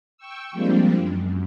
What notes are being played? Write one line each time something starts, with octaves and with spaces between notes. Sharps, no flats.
G5 C#6 E6
F3 G3 G#3 A#3 C4 D4
F#2